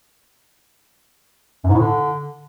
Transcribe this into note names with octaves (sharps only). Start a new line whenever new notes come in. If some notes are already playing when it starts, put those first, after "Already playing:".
F#2
G#2
A2
D3